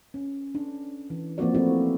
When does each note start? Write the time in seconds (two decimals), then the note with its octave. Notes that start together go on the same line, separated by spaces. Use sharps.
0.14 C#4
0.55 D4
1.10 E3
1.38 F3 A#3 C4 F#4 D5
1.54 A3 C4 E4 F#4